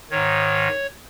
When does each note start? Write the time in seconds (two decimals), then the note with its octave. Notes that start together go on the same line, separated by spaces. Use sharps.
0.11 G#2 D#3 C#5